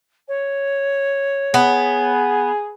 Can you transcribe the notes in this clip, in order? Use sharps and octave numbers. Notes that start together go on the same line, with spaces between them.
C#5
B3 G#4